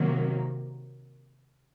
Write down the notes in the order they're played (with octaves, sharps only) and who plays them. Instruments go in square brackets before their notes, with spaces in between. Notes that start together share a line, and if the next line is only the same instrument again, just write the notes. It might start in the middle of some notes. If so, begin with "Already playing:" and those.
Already playing: [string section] C3 D#3 F#3 A#3